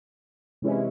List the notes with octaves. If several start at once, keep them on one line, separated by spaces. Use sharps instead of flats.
C3 E3 G#3 C#4 E4